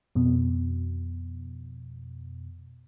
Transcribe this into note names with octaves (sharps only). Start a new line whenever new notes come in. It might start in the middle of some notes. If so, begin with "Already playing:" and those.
F2 B2